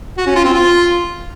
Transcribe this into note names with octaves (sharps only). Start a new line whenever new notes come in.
F#4
C#4
F4
C4
F4